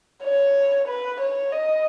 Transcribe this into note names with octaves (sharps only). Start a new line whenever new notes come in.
C#5
B4
C#5
D#5